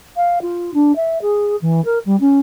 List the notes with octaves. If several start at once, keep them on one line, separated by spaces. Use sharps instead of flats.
F5
F4
D4
E5
G#4
E3
A#4
G3
C#4